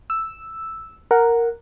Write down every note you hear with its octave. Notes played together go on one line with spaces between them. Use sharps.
E6
A#4 F#5